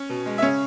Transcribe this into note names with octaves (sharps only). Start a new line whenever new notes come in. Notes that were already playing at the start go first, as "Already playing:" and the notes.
Already playing: C#4
B2
G#3
E5
C#3 C#4 C#5